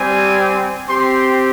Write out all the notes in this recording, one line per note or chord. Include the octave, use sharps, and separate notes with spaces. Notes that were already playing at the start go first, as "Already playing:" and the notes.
Already playing: G3 C4 G4 G#5
C4 G4 C6